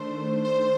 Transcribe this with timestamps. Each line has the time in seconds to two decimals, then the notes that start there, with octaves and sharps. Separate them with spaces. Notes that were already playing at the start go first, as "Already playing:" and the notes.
Already playing: D#3 A3 D4 C5
0.45 C5